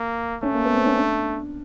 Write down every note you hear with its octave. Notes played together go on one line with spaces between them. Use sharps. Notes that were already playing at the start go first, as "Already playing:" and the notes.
Already playing: A#3
A3 C#4
A#3
B3
C4
C#4
D4